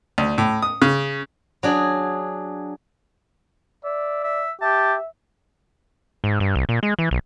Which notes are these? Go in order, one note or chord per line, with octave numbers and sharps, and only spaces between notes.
D2
A2
D#6
C#3
F#3 D4 G#4
D5 E5
E5
G4 E5 A5
G#2
G2
C2
A#2
G#3
E3
B1